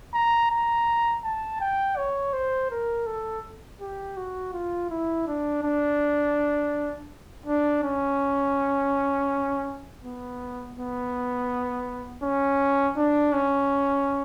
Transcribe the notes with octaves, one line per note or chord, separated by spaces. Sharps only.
A#5
A#5
A5
G5
C#5
C5
A#4
A4
G4
F#4
F4
E4
D4
D4
D4
C#4
B3
B3
C#4
D4
C#4